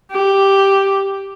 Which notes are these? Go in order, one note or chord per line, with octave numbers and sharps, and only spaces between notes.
G4